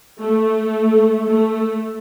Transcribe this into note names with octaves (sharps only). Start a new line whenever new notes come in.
A3
A3